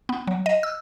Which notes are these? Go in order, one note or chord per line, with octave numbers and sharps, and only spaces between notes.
B3
F#3
D#5
E6